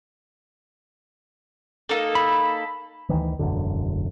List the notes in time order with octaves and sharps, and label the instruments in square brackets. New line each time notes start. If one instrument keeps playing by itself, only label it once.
[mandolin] A#3 D#4 A4
[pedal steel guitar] B5
[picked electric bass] D2 D#3 E3
E1 A1 F#2 D3